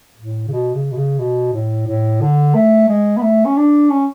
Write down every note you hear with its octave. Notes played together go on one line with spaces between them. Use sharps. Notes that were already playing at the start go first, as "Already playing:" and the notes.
A2
C#3
B2
C#3
B2
C#3
B2
A2
A2
D3
A3
G#3
B3
A3
C#4
D4
C#4